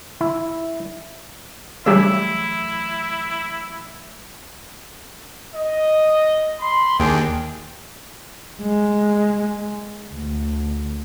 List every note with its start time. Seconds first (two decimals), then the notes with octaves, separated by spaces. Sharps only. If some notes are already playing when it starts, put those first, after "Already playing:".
0.21 E4
1.86 C#3 E3 F#3 G3 A3 D4 E4 E5
5.54 D#5
6.60 B5 C6
7.00 D#2 D4 G#4 G5
8.62 G#3
10.11 D2